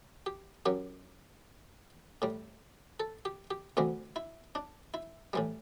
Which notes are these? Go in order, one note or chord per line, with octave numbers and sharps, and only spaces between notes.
G4
F#2 F#3 G4
A2 G3
A4
G4
G4
D2 C3 E3 G3 F#4
E4
D4
E4
A2 E3 G3